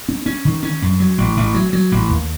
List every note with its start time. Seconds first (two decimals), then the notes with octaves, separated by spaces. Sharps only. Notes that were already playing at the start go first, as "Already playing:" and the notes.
0.08 C#4
0.26 C#4
0.45 D#3
0.63 C#4
0.82 F#2
1.00 F#3
1.18 A1
1.37 A1
1.54 F#3
1.73 F#3
1.92 A1
2.09 D#2